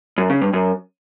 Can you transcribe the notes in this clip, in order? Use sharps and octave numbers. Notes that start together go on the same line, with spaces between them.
F#2
C#3
G2
F#2